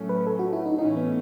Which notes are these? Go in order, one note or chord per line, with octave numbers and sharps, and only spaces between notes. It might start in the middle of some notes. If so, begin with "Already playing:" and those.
Already playing: A2 F#3 A3 C#4
B4
A4
F#4
E4
D#4
A2 E3 A3 C#4 D#4
B3